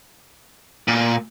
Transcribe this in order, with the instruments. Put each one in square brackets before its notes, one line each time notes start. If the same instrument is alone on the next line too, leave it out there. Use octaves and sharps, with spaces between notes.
[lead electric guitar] A#2